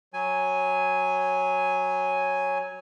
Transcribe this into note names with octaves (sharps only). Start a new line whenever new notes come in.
F#3 G#5